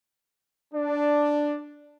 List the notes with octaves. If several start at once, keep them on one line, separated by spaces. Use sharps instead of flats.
D4